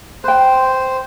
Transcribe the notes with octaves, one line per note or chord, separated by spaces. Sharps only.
B4 C5 G5